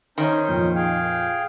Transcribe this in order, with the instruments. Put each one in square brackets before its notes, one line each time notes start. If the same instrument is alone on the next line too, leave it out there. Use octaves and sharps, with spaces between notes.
[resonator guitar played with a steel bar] D#3 [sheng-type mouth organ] C#4 D#4 C5
[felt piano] F2 A#2
[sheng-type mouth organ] G#4 F5 G5